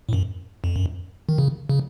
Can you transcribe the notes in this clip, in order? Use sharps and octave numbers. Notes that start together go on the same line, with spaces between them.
A2
F#2
F2
F#2
D#3
C#3
C#3